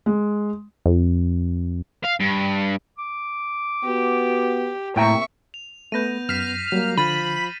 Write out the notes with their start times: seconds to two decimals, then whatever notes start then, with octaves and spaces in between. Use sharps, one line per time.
0.06 G#3
0.86 F2
2.05 F5
2.20 G2
2.98 D6
3.84 B3 F#4 G4
4.96 A2 C3 A#3 E5 G5 A#5 C#6
5.54 F7
5.92 A3 B3 B4 G6 A#6 D#7
6.29 F#2 F6 B6 C7 E7
6.72 F#3 G3 A#3
6.97 D3 F3 B5 F6 A6 D#7